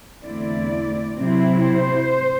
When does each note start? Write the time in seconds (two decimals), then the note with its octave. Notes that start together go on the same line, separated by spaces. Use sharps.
0.23 E2 D3 A3 C4 E4 D5
1.18 C3 F#3 C4 E4
1.64 C5